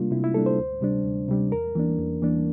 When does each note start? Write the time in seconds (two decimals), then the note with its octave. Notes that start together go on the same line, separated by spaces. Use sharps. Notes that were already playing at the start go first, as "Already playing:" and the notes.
Already playing: C3 G3 A#3 D4 F4
0.11 C3 E4
0.24 E4
0.34 G3 A#3 D4 A4
0.46 C5
0.58 D2
0.81 C3 G3 D4
1.05 D2
1.28 C3 G3 D4
1.52 E2 A#4
1.75 E3 A#3 D4
1.99 E2
2.22 E3 A#3 D4